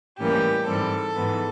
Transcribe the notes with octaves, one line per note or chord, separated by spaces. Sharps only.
A2 E3 G3 A#3 C#4 G4
G#2 E3 G3 C4 A4
G#2 E3 G#3 B3